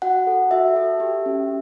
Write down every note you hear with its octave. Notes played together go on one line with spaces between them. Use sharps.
F#4 F#5
A4
F#4 E5
A4
G4
C#4